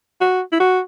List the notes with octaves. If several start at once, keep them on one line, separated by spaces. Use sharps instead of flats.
F#4
E4
F#4